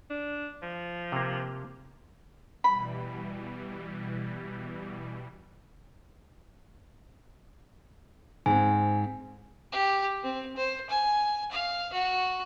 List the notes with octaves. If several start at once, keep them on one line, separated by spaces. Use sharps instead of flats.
D4
F3
C3 A#3
B2 E3 G3 B5
G#2 C4 G#5
G4
C4
C5
G#5
F5
F#4